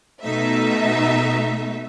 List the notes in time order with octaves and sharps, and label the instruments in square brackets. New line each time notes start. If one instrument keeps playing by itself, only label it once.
[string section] B2 A3 D#4 E5